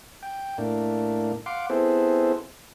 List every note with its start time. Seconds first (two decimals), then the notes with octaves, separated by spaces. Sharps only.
0.23 G5
0.58 A2 A#3 D4
1.46 F5 F#5 C6 D6
1.70 B3 C4 E4 G#4 A4 C5